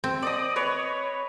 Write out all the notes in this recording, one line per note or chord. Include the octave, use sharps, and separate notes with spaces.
C4
D5 D#5 D#6
B4 C#5